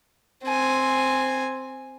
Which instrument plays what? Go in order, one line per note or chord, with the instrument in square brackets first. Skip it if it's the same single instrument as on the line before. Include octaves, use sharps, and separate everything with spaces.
[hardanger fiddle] C4 G#5